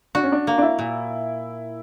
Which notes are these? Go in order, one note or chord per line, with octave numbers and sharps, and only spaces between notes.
D4 F#4
C#4
D4
A#3
D4
E4
A#2